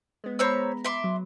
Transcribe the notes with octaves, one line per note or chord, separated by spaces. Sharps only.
G#3 B3
C5 C#5 A#5 B5 E6
E5 C6 D6
F#3